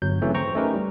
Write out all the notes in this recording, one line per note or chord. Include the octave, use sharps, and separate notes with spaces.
G1 F#3 G6
C#3 E3 F#3 A3 C4
C5 G5 A#5 C#6
A3 C#4 D#4 G4 A#4 B4
G3